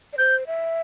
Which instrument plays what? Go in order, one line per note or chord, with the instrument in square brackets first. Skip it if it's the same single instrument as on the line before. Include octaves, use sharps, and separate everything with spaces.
[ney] D5
[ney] C5 [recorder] G6
[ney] E5